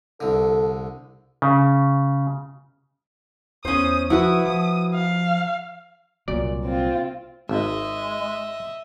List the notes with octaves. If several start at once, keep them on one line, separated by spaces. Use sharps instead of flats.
C2 D3 A4
C#3
E2 C#4 C5 D#6
F3 E4 F#4 B4 D#6
F3 D#6
F5
C2 A#2 F#3 D5
C4 F4
G#1 G#3 D#5 E5